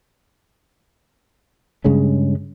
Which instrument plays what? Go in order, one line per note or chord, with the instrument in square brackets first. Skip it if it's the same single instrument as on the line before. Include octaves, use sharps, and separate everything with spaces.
[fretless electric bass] G2 C#3 G#3 C#4